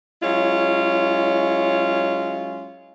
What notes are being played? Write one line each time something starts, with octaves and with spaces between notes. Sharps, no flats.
F#3 G#3 C#4 E4 F4